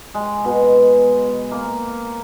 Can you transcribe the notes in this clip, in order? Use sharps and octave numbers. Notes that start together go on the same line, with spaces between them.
G#3
B2
A#3